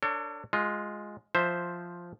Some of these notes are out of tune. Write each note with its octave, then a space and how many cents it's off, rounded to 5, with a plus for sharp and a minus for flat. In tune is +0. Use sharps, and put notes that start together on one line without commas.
D4 +0 A4 +40 C#5 +5
G#3 +5 F4 +15
F3 +0 C5 +0 E5 +0